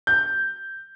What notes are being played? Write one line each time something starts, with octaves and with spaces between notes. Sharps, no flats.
G6